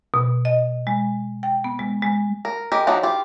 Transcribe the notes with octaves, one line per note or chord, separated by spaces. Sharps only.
B2
D#5
G#3
G5
B3
G#3
G#3
A#4
G#3 G4 A#4
F3 F#3 D4 D#4
F4 G4